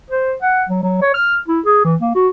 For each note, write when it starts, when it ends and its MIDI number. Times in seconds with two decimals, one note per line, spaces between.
0.11 0.34 72
0.42 0.64 78
0.69 0.82 54
0.83 0.99 54
1.02 1.09 73
1.14 1.36 89
1.48 1.60 64
1.65 1.82 68
1.85 1.96 52
2.01 2.11 58
2.15 2.29 66